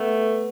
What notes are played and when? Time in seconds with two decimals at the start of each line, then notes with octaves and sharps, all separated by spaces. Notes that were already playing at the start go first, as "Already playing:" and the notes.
Already playing: A3 B3